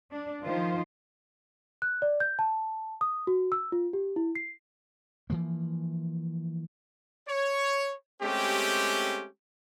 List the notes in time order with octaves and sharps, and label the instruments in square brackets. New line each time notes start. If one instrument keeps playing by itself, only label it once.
[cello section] D4
D#3 F3 F4 C5
[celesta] F#6
D5
G6
A5
D#6
F#4
E6
F4
G4
E4
C7
[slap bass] E3 F3 A#3
[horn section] C#5
G#3 A3 C4 C#4 G4